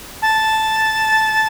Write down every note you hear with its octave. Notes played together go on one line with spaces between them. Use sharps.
A5